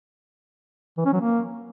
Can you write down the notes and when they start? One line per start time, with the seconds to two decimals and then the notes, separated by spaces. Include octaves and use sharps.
0.97 E3
1.05 C#4
1.13 F#3
1.21 A#3